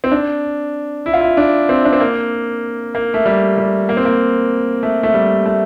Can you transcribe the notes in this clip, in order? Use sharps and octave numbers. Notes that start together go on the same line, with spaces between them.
C4
D4
E4
F4
E4
D4
C4
D4
C4
A#3
A#3
A3
G3
G3
A#3
C4
A#3
A3
A3
G3
A3